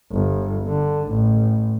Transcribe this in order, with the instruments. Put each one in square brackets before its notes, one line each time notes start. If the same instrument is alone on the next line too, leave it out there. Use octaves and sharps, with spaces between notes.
[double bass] G1
D3
A1